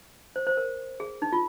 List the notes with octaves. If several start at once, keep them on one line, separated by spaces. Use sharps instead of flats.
C5
C5
A#4
G#4
D#4
F4